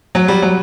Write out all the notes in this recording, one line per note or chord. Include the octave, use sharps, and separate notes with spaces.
F#3
G3
F#3